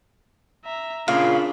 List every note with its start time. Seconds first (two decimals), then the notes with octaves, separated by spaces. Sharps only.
0.65 E5 A#5
1.08 A#2 C#3 D4 F5 B5